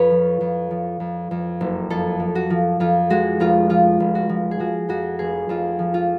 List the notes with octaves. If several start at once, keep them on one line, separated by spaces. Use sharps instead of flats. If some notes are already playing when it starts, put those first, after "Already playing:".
Already playing: F2 B4 C#5
F3
F2
F3
F2
F2
F#1
F2 A4
F3
F#4
F3
F2 F4
G#3 F#4
F1 F4
F3 F4
F1
F#4
F3
G#4
F3 F#4
F2 F#4
F1 G#4
F2 F4
F3
F4